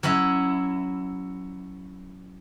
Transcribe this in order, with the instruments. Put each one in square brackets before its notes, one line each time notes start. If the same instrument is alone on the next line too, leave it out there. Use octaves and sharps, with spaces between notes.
[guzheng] F#3 C#4 E4